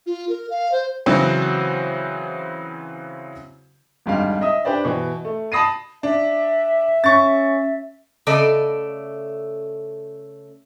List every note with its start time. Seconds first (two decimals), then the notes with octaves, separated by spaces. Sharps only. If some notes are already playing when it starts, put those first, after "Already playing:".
0.06 F4
0.29 A#4
0.50 F5
0.72 C5
1.06 C#3 E3 F#3 C4 F#4 C5
4.06 G#1 F2 G#2 G3 D4 F5
4.41 D#5 E5 D#6
4.65 D4 G4 B4 C5 D5
4.85 B2 E3
5.25 A3
5.52 A5 B5 D#6 A#6 C7 D#7
6.03 D4 E5
7.04 C#4 C#6 A6
8.27 C#3 A3 A4 D5 D#5